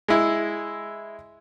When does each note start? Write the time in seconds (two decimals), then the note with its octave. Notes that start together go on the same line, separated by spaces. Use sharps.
0.08 G#3 E4